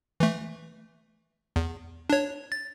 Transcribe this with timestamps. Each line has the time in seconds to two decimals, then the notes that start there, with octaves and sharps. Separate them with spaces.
0.20 E3 A3
1.56 E2
2.10 D4 C#5
2.52 A6